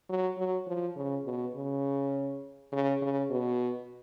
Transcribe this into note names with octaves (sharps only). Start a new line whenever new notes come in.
F#3
F#3
F3
C#3
B2
C#3
C#3
C#3
B2